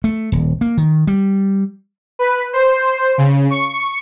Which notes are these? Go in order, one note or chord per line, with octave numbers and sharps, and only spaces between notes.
A3
D#1
A#3
D#3
G3
B4
C5
C#3
C#6